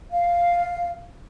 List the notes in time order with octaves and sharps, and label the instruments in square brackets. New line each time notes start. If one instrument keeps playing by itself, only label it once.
[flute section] F5